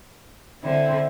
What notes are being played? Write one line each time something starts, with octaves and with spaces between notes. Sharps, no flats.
D3 C4 E4